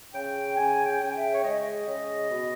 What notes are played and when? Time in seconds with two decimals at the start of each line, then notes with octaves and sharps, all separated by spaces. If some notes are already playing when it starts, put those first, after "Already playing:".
0.14 C#3 G5
0.57 C#3 G#5
0.86 G5
1.01 C#3 G5
1.15 E5
1.34 C#5
1.44 G#3 D#5
1.87 C#3
2.30 B2